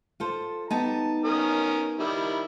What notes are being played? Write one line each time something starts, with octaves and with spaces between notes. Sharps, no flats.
F4 A4 C5
G3 B3 D#4 A5
C#4 A#4 D#6
D#3 G3 E4